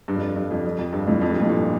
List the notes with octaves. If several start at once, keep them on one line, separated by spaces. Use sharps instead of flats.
G2
F2
G2
G2
F2
F2
F2
G2
F2 A2
F2
G2
A#2
F2 A2
G2 A#2